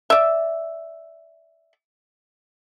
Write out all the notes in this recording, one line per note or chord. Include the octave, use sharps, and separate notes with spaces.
D5 E5